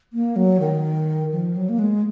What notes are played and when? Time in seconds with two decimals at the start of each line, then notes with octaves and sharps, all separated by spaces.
0.13 A#3
0.36 F#3
0.60 D#3
1.32 F3
1.56 F#3
1.69 A#3
1.79 G#3